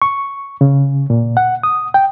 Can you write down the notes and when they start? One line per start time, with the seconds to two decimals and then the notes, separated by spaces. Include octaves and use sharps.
0.02 C#6
0.61 C#3
1.10 A#2
1.37 F#5
1.63 D#6
1.94 G5